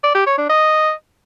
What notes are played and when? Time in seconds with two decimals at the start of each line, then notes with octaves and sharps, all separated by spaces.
0.03 D5
0.15 G4
0.26 C#5
0.38 D4
0.49 D#5